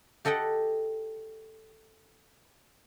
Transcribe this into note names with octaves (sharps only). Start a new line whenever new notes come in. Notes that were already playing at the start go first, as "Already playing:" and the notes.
G4 A4 D#5 F#5 G5